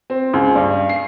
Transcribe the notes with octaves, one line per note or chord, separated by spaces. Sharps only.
C4
C#2
G2
C7